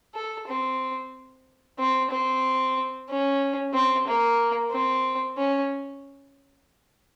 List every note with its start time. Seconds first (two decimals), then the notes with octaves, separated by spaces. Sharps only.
0.15 A4
0.48 C4
1.79 C4
2.11 C4
3.09 C#4
3.74 C4
4.07 A#3
4.71 C4
5.38 C#4